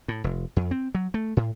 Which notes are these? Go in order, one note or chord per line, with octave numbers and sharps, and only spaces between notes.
A2
F1
F2
C4
F#3
A3
A2